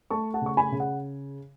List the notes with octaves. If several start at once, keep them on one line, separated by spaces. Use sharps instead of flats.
A3 A5 C#6
F#5 A5
C#3 C#6
G#5 B5
C#3
F#5